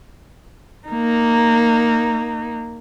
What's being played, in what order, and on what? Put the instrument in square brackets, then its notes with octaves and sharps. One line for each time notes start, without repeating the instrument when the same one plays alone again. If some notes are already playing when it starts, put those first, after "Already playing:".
[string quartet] A#3 D#4